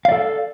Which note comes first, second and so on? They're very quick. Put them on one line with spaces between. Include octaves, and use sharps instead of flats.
F5 D5 A4